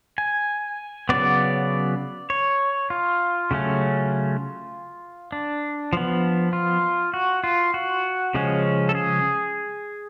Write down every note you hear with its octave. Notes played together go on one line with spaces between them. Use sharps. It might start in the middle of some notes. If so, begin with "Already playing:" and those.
G#5
C#3 F#3 B3 D5
C#5
F4
C#3 F#3 A3 C#4
D4
F3 B3
F4
F#4
F4
F#4
C#3 F3 G#3 C#4
A4
G#4